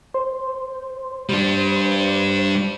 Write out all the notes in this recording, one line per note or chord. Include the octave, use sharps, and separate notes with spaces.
C5
G3 D4